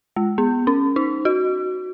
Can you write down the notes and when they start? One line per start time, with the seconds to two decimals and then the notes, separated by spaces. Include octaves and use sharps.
0.16 G#3
0.38 B3
0.67 C#4
0.96 D#4
1.25 F#4